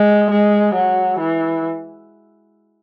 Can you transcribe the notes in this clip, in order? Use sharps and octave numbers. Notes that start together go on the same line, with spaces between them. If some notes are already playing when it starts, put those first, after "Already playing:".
Already playing: G#3
G#3
F#3
E3